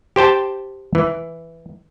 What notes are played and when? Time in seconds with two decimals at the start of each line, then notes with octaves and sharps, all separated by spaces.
0.16 G4 C5 G5 A5
0.95 E3